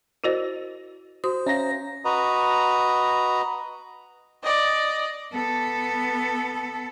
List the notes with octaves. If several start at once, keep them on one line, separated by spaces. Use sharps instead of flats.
E4 F#4 A#4 C5 D#5
F#4 C5 D#6
C#4 E5 F5 A#5 A#6
F#4 B4 D#5 A#5
D5 D#5
B3 A4